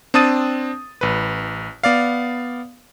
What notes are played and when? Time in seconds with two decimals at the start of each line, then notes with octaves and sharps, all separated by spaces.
0.14 C4 D4 A5 D#6 A6 D#7
1.01 A1 B4
1.84 B3 D5 F5